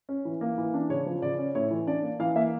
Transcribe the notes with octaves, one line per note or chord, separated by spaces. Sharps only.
C#4
E3
A#3
E3
D4
C#3 C#5
F3
C#3 D5
C#4
A2 C#5
E3
D4 D5
A#3
E3 F5
A#3 E5